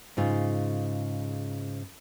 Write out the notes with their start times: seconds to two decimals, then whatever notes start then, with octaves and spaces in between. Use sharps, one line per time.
0.17 G#2 C#3 F4